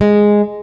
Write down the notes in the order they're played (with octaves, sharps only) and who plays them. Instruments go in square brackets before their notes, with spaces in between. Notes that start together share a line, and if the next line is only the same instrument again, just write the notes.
[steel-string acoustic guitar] G#3